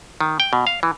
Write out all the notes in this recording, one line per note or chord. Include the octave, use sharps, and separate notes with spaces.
D#3
G5
B2
F5
E3